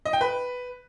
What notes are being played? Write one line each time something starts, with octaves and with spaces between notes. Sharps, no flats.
D#5
G5
B4